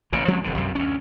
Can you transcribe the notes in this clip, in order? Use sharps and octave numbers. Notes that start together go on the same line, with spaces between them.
A1 A#2 C#3
F3 G#3 C4 C#4
E1 F2 D3
B1 F#2 C3
D2 C#4